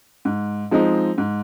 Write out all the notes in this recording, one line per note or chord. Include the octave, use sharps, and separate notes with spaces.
G#2
F3 G#3 C4 D#4
G#2